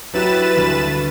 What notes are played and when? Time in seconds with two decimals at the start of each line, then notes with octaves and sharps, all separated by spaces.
0.13 F#3 E4 G4 B4 A6 E7
0.56 D2 G2